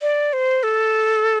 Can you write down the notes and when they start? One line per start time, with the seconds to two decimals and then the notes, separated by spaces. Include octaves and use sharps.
0.02 D5
0.33 C5
0.63 A4